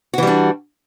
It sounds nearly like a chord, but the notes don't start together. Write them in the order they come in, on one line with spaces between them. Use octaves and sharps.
F#4 E3 G3 D4